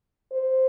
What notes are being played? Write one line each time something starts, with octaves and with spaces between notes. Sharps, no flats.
C5